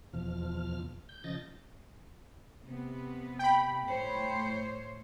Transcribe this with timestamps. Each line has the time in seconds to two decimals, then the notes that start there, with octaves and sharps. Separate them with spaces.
0.13 E2 B2 F3 F6
1.09 G6
1.24 C#3 F3 D#5 G6 A6 A#6
2.64 C3 B3
3.39 G5 B5
3.86 A2 C5 C#5